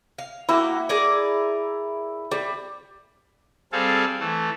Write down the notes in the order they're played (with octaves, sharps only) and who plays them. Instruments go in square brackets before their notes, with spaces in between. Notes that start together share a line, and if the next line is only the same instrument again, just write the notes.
[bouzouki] F5
[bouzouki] A#3 F#4 G4 [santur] E4
[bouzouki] G#4 A#4 D5
[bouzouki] G3 [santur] D5
[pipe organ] G3 C4 G#4 A4 F5
E3 A3